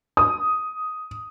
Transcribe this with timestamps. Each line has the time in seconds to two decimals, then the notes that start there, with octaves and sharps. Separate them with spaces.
0.17 D#6